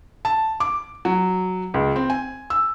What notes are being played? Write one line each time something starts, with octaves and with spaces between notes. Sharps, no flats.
A5
D6
F#3
C#2
C4
G#5
E6